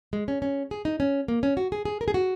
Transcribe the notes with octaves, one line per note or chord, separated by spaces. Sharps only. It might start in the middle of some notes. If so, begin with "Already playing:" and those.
G#3
C#4
C#4
G#4
D#4
C#4
A#3
C#4
F#4
G#4
G#4
A#4
G#4
F#4